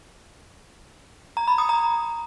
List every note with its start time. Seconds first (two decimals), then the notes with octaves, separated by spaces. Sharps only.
1.37 A#5
1.48 B5
1.58 D#6
1.69 A#5